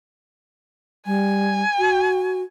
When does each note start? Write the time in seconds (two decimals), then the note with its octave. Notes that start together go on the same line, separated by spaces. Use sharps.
1.06 G3 G#5
1.79 F#4